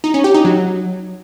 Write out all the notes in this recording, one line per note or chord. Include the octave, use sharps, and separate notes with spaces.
D#4
C#4
G4
D#4
F#3